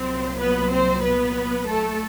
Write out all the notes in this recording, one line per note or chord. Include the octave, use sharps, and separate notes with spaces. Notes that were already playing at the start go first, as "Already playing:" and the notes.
Already playing: C2 A#2 F#3 C4 C5
B3 B4
C4 C5
B3 B4
A3 A4